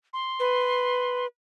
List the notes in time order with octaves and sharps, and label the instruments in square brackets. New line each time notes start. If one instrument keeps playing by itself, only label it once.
[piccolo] C6
[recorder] B4